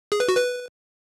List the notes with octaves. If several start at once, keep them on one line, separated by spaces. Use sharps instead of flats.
G#4
B4
F#4
B4